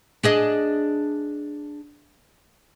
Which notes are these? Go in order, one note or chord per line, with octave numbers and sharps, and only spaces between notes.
D4 G#4 D#5